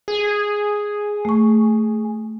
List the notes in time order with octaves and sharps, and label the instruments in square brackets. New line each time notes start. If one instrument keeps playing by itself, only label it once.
[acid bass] G#4
[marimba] A3 C#6